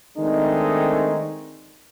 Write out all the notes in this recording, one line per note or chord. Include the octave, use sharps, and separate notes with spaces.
D#3 G#3 A3 C4 D4 D#4